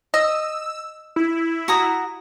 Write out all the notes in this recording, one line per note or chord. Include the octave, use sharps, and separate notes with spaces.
D#5 E6
E4
F#4 A#5 D#6